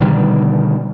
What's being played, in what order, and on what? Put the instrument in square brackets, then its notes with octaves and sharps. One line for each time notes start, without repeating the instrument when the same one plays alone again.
[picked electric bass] B2 D3 D#3 G3